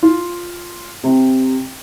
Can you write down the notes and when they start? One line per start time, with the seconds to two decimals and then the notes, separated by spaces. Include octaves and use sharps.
0.03 F4
1.04 C3